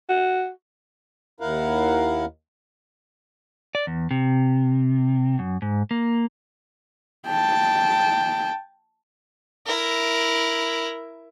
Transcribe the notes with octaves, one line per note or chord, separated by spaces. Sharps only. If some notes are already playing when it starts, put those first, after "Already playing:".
F#4
D#2 E4 A#4 F5 F#5
D5
E2
C3
F#2
G#2
A#3
G5 A5
E4 A#4